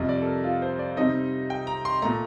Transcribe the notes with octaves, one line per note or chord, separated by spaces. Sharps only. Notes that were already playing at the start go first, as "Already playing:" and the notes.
Already playing: F2 C3 G3 D#5
D5
A4
A#4
F4
C5
D5
C3 G3 C4 D#4 D#5
G5
A#5
C6
A#2 A3 A#5